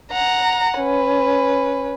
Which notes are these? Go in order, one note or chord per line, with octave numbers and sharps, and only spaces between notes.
F#5 A#5
C#4 B4